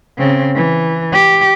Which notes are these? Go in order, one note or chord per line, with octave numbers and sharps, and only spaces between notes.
C#3 C4
E3
G4